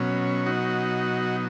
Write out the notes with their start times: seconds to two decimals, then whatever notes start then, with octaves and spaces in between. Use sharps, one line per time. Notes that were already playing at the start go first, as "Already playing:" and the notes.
Already playing: B2 F#3 C#4
0.46 D#4 F#4